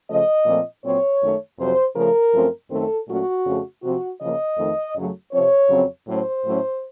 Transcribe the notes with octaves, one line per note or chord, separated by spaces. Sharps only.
C#3 F3 A3 D#5
A#2 F3 A3 C4
A#2 F#3 C4 C#5
F#2 D#3 A3
F2 C3 F#3 C5
C#3 F3 A3 A#4
F#2 F3 A3 C4
F#2 D#3 A3 C4 A4
A#2 F#3 A3 C#4 F#4
F2 C#3 A3
C3 F3 C4 F#4
C#3 F3 A#3 D#5
F2 D#3 A3
F#2 C#3 F#3 A3
C3 F3 C4 C#5
F2 C#3 F#3 C4
A2 F#3 A3 C#4 C5
A2 F#3 A3 C#4